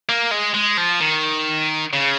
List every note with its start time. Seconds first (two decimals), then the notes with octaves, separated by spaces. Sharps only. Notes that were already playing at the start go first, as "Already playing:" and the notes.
0.09 A#3
0.31 G#3
0.54 G#3
0.77 F3
1.00 D#3
1.93 C#3